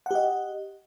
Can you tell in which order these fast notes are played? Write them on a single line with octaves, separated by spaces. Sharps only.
F#5 G4 D#5